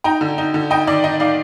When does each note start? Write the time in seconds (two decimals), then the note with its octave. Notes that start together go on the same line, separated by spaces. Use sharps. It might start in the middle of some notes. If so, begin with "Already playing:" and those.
0.04 D#4 G5 A#5
0.21 D3
0.38 D#4
0.54 D3
0.71 D#4 D#5 G5
0.87 D#3 D5
1.04 D#4 D#5
1.20 D#4 D5 F5